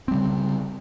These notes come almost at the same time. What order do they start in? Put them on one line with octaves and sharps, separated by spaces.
C4 G3 C#3